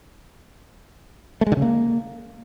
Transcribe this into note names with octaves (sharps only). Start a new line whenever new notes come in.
A3
G#3
D3
C#3
A#3